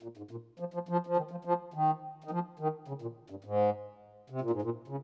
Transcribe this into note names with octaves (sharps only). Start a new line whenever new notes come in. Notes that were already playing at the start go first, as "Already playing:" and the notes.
A#2
G#2
A#2
F3
F3
F3
F3
D#3
F3
F3
D#3
D#3
F3
D#3
C#3
A#2
G2
G#2
C3
A#2
G#2
A#2
C#3